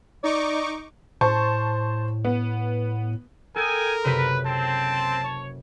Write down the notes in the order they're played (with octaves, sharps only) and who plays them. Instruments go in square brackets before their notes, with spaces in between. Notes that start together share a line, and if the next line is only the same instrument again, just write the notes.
[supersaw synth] D#4 C#6 D6 [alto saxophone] D5
[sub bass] A2 [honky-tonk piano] C5 A5 C#6
[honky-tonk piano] B3
[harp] A4 D#6 [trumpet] A#4 [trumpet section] G5 G#5
[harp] F#1 C3 C5 [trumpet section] B4
[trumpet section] C4 [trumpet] A5
[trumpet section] C#5